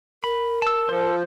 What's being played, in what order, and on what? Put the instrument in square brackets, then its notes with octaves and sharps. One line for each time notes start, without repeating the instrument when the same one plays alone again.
[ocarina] A#4 [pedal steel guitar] B5
[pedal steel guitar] A5 E6
[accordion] F3 [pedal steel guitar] A4 C5